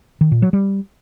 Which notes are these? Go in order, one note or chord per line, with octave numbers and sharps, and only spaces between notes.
D#3
A#2
F#3
G3